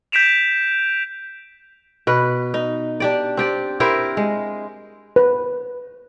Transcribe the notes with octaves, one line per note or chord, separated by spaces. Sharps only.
G6 B6 D7 E7 F7
B2 B4
D#4
D4 G4 D5
C4 G4 D5
E4 G4 A#4 C5
G#3
B4